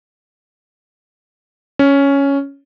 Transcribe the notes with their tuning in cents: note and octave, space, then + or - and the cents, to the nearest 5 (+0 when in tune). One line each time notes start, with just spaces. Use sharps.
C#4 +5